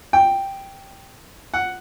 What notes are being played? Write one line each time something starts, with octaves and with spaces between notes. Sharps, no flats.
G5
F#5